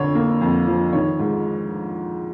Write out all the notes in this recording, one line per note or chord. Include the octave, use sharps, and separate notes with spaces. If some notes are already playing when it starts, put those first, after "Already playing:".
Already playing: F2 D3 C#5
A#3
F2
F3
D#3 C#5
G#2